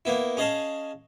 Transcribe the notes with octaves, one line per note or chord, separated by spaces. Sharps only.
A#3 B3 E4
C#4 G#4 D#5 F5 A5